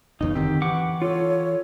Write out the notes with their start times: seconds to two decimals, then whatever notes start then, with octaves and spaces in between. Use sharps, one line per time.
0.21 F#1 E2 C#3 D#4
0.35 D3 D#3 C4 G4
0.62 E3 F#5 C#6 D6
1.02 F4 A4 C#5